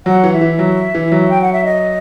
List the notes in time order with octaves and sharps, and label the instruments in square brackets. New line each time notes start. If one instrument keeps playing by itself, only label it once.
[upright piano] F#3 [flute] F#5
[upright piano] E3
[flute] E5
[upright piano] E3
F#3
E3
F#3
[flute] G5
F#5
E5
D#5